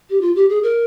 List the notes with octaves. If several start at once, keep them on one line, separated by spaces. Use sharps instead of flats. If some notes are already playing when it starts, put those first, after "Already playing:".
G4
F4
G4
G#4
A#4